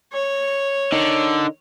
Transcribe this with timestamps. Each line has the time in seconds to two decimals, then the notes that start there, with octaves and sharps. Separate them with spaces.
0.13 C#5
0.92 D3 D#4 A#4